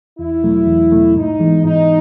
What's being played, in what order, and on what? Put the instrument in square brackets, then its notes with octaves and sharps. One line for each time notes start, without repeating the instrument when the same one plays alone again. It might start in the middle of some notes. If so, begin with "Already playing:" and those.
[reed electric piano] E2 [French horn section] E4
[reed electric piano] B2 F#3 A3
E2
B2 F#3 A3
[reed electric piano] G#2 [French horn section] D#4
[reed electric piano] E3 G#3 B3
[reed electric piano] G#2 [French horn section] D#4